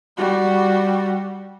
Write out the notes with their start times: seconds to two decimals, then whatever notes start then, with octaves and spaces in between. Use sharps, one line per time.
0.17 G3 F#4